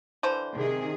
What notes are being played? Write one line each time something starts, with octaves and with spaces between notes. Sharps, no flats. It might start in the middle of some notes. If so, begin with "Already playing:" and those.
D3 E3 C5
C3 D#3 G#4